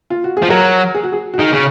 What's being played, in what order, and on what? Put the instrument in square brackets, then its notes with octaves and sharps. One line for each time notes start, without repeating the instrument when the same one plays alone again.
[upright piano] F4
F#4
G#4
[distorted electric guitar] F3
[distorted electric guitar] F#3 [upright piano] A#4
[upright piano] G#4
F#4
G#4
F#4
[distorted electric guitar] D#3 [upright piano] G#4
[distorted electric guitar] C#3